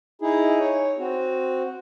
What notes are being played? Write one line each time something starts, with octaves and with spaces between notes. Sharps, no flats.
D#4 E4 G#4
C#5
C4 F#4